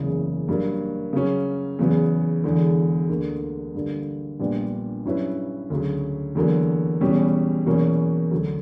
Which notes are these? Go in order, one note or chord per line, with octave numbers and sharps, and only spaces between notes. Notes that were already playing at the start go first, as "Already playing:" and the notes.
Already playing: F#1 E2 C#3
G2 F#3 A#3
C#3 F#3 C#4
E2 C#3 F#3 B3
E1 E2 D3
D2 D3 A#3
G2 D3 A#3
A#1 A#2 G3 B3 D4
G2 F#3 C#4 E4 B4
D2 C#3 F#3
E2 D3 F#3 A#3
E2 B2 G3 C#4 G4
E2 B2 F#3 A#3 C#4
D2 D3 F#3